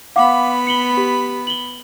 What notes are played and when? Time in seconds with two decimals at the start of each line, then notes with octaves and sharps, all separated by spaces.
0.16 B3 F5 F#5 B5 D6
0.67 C#7 F#7 G7
0.97 G4
1.47 F#7 G7